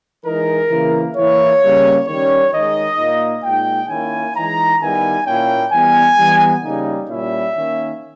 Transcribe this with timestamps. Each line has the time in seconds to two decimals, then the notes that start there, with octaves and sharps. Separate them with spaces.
0.24 E3 G#3 D#4 A#4
0.70 C#3 E3 A#3 E4
1.16 E3 A#3 E4 C#5
1.62 C#3 G3 A#3
2.07 D#3 G3 C#4 C#5
2.53 D#3 G#3 D#4 D#5
2.99 A#2 A#3 D#4
3.44 A#2 G#3 D#4 G5
3.89 D#3 A#3 C#4 E4 G#5
4.35 E3 G#3 D#4 A#5
4.81 D#3 G3 B3 E4 G#5
5.27 A#2 A#3 C#4 E4 G5
5.72 E3 G3 B3 G#5
6.18 E3 G3 B3
6.63 C#3 G3 A#3 D#4
7.09 A#2 G3 C#4 E4 E5
7.55 D#3 A#3 C#4